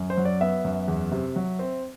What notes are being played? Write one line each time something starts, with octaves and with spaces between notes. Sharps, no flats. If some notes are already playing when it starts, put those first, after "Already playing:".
Already playing: F#2
C5
F#3
D5
B3 E5
F#2
E2
C3
F#3
C4